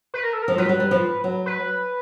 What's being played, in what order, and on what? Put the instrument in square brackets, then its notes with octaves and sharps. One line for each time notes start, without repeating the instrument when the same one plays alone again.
[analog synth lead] B4
A#4
A4
A#4
[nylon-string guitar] F3
[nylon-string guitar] F#3 [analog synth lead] B4
[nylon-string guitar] G3
F#3
G3
F3
F#3
[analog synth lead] B4